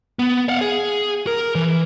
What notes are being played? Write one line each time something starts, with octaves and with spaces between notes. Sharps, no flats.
B3
F5 F#5
G#4
A#4
E3